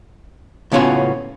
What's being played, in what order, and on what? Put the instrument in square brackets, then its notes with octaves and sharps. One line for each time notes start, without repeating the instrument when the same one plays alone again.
[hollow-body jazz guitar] A2 C#3 B3 C#4 F4 F#4